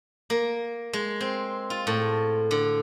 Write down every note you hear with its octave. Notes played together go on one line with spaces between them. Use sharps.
A#3
G#3
C4
F4
A2
D3